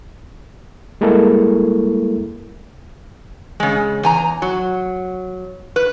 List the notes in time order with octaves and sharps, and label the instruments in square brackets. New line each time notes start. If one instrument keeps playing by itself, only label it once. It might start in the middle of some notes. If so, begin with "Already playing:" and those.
[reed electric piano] G3 G#3 A#3 E4 A4 A#4
[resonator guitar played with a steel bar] C#3 G#3
E2 G#5 A#5
F#3
B4